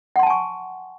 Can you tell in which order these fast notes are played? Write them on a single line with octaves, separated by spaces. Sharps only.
F#5 C6 A5 G#5 C#6